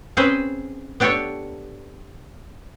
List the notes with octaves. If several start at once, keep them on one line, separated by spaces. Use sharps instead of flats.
C4 C#4 G#4 B4 C5
B3 D4 G4 A4 C#5